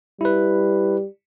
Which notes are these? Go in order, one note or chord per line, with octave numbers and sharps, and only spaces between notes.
G3 E4 B4